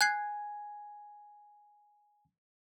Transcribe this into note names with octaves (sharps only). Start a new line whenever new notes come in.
G#5 F#6 G#6 C7